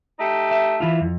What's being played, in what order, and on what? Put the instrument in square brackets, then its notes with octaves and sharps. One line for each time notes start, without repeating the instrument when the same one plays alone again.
[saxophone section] A3 D#4 G4
[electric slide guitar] E5
E3 E4 F4
F2